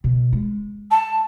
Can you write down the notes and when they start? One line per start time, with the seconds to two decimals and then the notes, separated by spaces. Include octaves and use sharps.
0.04 B2
0.33 G#3
0.91 A5